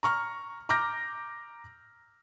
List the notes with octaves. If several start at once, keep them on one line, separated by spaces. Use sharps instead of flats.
A#5 C#6 F6
A#5 D6 F6 G6 A#6